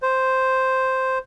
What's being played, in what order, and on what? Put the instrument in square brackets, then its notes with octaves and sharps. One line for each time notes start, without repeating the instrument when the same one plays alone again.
[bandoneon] C5